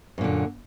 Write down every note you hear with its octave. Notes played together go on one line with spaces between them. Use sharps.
F#2 A#2 D3